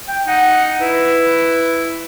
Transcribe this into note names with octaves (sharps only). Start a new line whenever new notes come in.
G5
D#4 F#5
E4 B4